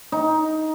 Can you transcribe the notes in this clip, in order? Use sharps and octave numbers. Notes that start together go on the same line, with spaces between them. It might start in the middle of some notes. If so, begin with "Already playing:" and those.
D#4